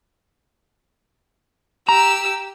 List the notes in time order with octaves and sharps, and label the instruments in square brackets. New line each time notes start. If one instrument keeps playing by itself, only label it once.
[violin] G4 E6 [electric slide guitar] A#5